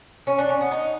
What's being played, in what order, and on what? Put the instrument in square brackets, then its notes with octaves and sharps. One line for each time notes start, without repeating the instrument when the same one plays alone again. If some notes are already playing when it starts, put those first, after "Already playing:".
[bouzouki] C#4
D4
C#4
B3
D#4